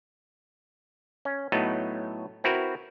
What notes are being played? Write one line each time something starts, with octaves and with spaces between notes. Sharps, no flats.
C#4
A2 F#3 A3 B3 D#4
C4 E4 F#4 A#4 B4